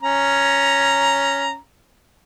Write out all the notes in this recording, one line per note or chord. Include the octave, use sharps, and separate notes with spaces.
C#4 A#5